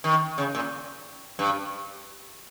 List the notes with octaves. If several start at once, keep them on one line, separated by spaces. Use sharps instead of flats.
D#3
C#3
A#2
G2